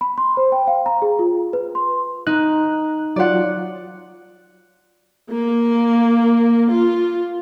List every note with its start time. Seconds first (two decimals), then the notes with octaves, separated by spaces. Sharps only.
0.01 B5
0.18 C6
0.37 C5
0.52 G5
0.67 F5
0.86 A#5
1.02 G#4
1.19 F4
1.53 B4
1.75 C6
2.27 D#4 F#6
3.16 F#3 F4 D5 F#5
5.30 A#3
6.71 F4